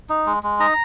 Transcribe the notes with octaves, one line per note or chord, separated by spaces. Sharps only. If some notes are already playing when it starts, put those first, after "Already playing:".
D#4
G#3
G#3
D#4 A#5